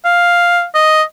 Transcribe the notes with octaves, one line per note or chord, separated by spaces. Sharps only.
F5
D#5